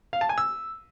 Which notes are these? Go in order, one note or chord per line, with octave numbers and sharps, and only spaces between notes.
F5
A5
G#5
E6